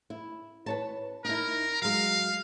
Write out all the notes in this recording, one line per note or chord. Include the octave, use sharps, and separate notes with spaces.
E4
B4 C#5 A5
D#4 E4 A#4
F#3 G#3 F5